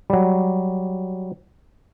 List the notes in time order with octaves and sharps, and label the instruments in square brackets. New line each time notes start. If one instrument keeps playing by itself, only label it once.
[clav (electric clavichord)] F#3 G3